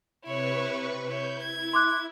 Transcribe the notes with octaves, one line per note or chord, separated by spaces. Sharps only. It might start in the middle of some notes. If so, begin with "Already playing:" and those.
C3 E4 B4 C#5 C#6
E4 C#5 G6
E4 G#6
C6 D6 F#6